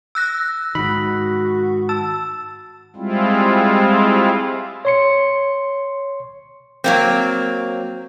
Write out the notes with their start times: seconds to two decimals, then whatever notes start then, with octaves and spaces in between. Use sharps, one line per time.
0.15 E6 F#6 A#6
0.75 G#2 D#3 F#4 B5
1.89 A5 E6
2.96 G3 G#3 C4 E4 F4
4.85 C#5 C6 C#7
6.84 F#3 A#3 C4